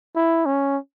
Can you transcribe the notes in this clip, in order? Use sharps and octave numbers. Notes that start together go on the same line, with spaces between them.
E4
C#4